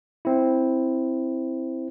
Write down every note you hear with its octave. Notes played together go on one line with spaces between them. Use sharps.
C4 E4